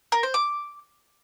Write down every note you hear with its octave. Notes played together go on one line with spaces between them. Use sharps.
A#4
C5
D6